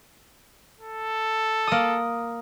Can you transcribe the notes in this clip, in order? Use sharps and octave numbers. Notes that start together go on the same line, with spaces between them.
A4
A#3 D#6